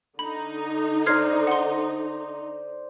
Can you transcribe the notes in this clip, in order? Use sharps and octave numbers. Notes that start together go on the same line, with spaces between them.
D3 D#4 B5
C5 D5 F6 G#6 C7
F#5 C6